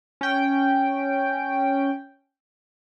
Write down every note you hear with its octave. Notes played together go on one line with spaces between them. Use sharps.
C#4 G5